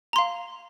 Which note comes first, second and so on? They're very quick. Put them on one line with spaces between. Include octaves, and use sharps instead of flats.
A#5 C6 F5